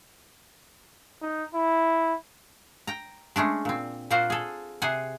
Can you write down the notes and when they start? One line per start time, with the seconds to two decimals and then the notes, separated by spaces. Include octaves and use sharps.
1.22 D#4
1.54 E4
2.87 G5 A#5
3.36 G#3 A3 C#4 D4
3.65 A#2 C4
4.10 A#2 A#3 F4 F#4 C5
4.30 G#4 A4
4.82 C3 G#4 C5 F#5 G#5